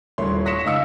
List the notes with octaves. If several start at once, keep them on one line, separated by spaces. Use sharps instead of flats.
D#1 G2 E4 C#5 C6
C#6 D#6 A#6 B6 C#7 E7
C#2 D#4 F5 E6 C#7